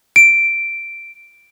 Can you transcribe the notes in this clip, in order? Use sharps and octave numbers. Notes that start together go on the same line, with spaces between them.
D7